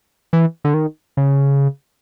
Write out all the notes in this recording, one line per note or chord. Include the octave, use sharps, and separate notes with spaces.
E3
D3
D#3
C#3